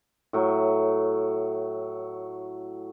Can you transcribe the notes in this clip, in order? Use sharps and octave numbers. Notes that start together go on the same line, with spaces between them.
A2 F#3